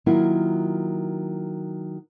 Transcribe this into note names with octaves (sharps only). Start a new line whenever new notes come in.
D#3 F#3 A#3 E4 F4